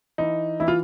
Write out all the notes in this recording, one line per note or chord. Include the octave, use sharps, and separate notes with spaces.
E3 D#4
E3 E4
F4